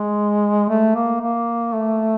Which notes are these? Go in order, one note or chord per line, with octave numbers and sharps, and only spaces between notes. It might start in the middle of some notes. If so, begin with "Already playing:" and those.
Already playing: G#3
A3
A#3
A#3
A3